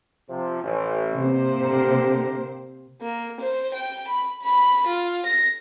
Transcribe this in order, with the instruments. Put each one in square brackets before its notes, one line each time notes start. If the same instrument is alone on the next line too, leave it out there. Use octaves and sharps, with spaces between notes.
[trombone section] C3 F3
A1
[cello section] C3 A#3 C5
[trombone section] D3 G4 A#4
[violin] A#3
C5
G5
B5
B5
F4
A#6